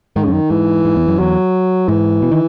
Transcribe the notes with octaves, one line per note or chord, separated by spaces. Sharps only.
G#2 D#3
C#3
F#2 D#3
G#2 E3
G#2
E2
F#2
E2 F#3
G#2 E3
B2
D#3